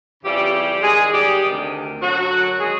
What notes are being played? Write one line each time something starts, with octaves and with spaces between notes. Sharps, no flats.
F2 C#3 E3 G3 G4
G#2 D#3 G#3 G#4
G3 G4
D2 C3 D#3
F#2 D3 F#3 F#4
D#3 G#3 G#4